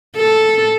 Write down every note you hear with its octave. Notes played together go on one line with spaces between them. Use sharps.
A4